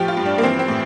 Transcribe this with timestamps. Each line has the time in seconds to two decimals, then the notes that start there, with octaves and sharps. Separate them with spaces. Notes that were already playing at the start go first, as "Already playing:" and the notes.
Already playing: A2 F3 G4
0.08 F4
0.17 G2
0.26 D4
0.38 A#3
0.43 E3 C4
0.59 C4
0.68 A2